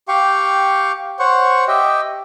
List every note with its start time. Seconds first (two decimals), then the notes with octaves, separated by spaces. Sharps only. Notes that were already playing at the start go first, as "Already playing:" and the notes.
0.08 G4 F5 G5 C#6
1.19 C5 C#5 F#5 C#6
1.68 G4 D#5 E5 G5